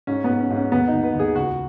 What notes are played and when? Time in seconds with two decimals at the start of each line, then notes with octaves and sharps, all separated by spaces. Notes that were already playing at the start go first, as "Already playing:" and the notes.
0.07 G#2 C#4
0.24 G#2 B3
0.40 C#4
0.50 G#2
0.56 C#4
0.72 D#2 B3
0.88 D#4
0.93 D#2
1.03 B4
1.14 D#2
1.19 G#4
1.35 C#2 F#4